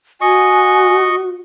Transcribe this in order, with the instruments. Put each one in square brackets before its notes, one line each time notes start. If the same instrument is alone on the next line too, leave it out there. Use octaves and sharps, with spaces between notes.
[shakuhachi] F#4 [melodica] D#5 C#6 [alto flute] G#5